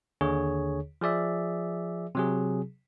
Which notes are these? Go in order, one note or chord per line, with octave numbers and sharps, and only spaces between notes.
D#2 D3 G#4 C#5
F3 G#4 D5 E5
C3 F#3 G#4